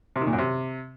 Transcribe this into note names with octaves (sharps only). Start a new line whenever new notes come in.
C3
D#3
A#2
F#2
C3